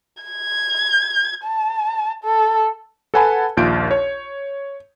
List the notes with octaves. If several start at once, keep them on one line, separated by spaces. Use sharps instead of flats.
G#6
A5
A4
A4 B4 F#5 G#5 A5 B5
A#1 D#2 F4 G6 D7
C#5